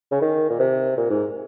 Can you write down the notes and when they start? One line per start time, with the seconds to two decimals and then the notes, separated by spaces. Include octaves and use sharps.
0.11 C#3
0.21 D#3
0.50 A#2
0.59 C3
0.97 A#2
1.10 G#2